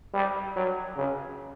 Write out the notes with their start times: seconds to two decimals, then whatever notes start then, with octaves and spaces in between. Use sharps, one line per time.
0.14 G3
0.56 F#3
0.97 C#3